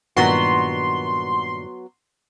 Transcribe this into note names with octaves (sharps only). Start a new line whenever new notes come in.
G2 A#2 D#3 F#3 B3 F#4 C6